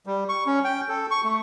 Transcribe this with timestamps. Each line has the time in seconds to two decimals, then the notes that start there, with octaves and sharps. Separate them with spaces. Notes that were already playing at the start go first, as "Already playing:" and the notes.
0.06 G3
0.29 C#6
0.46 C#4
0.64 G5
0.89 A4
1.11 C#6
1.24 A3